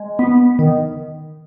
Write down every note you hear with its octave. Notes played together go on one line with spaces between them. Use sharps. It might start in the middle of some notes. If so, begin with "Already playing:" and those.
Already playing: G#3
B3
D#3